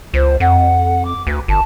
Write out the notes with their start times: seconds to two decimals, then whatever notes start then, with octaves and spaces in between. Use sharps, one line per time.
0.14 C#2 C5
0.40 F2 F#5
1.04 D6
1.27 D2 B4
1.48 G1 A5